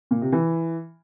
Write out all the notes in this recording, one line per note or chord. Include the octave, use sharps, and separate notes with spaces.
A#2
C3
E3